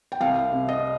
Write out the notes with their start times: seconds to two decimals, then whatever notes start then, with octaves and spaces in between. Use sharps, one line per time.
0.12 G5
0.20 C2 F5
0.52 C3
0.69 D#5